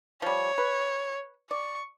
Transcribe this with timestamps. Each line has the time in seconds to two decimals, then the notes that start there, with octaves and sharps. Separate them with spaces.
0.22 F3 G3 C#5
0.58 B4
1.51 D5 C#6